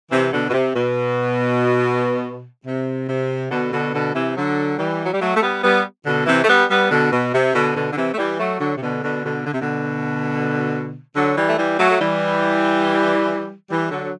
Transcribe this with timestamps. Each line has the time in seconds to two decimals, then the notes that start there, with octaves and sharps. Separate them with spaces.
0.11 C3 E3
0.32 B2 D3
0.49 B2
0.53 C3
0.75 B2
2.66 C3
3.08 C3
3.50 B2 D3
3.72 B2 D3
3.94 B2 D3
4.14 C3 E3
4.36 D3 F#3
4.78 E3 G3
5.04 F#3
5.13 G3
5.21 F#3 A3
5.36 A3
5.42 G3 B3
5.63 G3 B3
6.05 B2 D3
6.26 C3 E3
6.44 A3
6.48 G3 B3
6.69 G3 B3
6.91 B2 D3
7.11 B2
7.34 C3
7.54 B2 D3
7.75 B2 D3
7.92 D3
7.97 C3 E3
8.13 A3
8.18 E3 G3
8.40 F#3 A3
8.60 D3 F#3
8.77 C3
8.81 B2 D3
9.03 B2 D3
9.24 B2 D3
9.46 D3
9.53 C3
9.61 B2 D3
11.15 D3 F#3
11.37 E3 G3
11.48 A3
11.58 E3 G3
11.79 F#3 A3
11.90 A3
12.00 E3 G3
13.70 E3 G3
13.91 D3 F#3
14.03 F#3